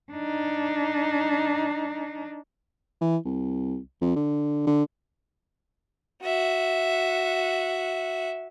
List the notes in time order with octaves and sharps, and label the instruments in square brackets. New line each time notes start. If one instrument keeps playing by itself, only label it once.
[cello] D4 D#4
[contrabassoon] E3
C2
F2
D3
D3
[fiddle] F#4 E5